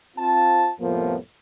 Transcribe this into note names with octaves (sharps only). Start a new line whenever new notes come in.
C4 F4 A5
C2 F2 A2 F3 A#3 B3